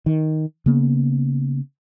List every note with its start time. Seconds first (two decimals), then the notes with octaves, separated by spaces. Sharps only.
0.06 D#3
0.66 C#3 A#3 B3